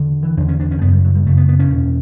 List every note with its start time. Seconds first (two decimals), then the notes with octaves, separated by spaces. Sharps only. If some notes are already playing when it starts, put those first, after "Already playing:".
Already playing: E2 D3
0.23 E3
0.37 E2 D4
0.40 D3
0.48 C#4
0.60 D4
0.71 C#4
0.81 F#2 C#3 B3
0.93 G3
1.05 F#3
1.15 G3
1.26 F#2 C#3 A3
1.37 B3
1.49 B3
1.59 C#4
1.70 E2 B2